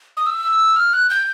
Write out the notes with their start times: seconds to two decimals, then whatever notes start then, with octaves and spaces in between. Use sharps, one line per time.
0.17 D#6
0.26 E6
0.76 F6
0.93 F#6
1.10 G6